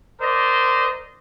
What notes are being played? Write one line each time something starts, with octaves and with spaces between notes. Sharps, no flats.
A#4 C5 D5 D#5